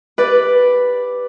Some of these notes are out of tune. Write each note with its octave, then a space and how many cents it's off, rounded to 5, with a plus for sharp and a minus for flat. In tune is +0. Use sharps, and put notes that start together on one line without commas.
G4 +0 B4 +0 D5 +0